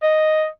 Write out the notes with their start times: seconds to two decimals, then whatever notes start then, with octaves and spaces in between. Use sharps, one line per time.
0.02 D#5